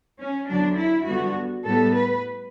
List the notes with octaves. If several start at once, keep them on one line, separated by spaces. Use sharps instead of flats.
C#4
E2 D3 F#3 D4
E4
G2 D3 G3 B3 F#4
A2 G3 B3 A4
B4